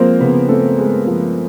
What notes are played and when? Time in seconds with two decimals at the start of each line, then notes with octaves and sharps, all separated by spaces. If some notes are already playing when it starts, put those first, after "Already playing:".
Already playing: F3 G#3 A#3 C4 A#4 C5
0.20 C#3 B3 B4
0.49 A3 C4 A4
0.78 G#3
1.07 F3